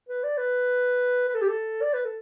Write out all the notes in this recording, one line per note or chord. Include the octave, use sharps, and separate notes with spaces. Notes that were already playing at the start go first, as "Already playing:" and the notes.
B4
D5
B4
B4
A4
G4
A4
D5
B4
A4